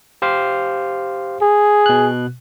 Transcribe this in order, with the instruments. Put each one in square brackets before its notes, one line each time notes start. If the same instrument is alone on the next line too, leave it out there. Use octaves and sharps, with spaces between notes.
[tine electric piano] G4 C5 F5
[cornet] G#4
[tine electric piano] B2 F#6